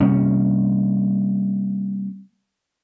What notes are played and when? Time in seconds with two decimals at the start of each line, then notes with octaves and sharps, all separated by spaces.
0.01 C3 G3 A#3 C#4